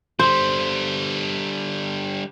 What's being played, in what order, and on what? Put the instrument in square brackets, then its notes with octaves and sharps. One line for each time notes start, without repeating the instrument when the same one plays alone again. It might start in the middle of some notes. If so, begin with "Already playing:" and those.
[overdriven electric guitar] D3 G3 [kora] C5